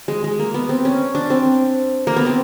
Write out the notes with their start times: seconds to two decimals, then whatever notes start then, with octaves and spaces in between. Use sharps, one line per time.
0.08 G#3
0.24 G#3
0.39 A#3
0.54 B3
0.69 C4
0.85 C#4
1.15 D4
1.30 C4
2.07 A#3
2.16 B3
2.26 C4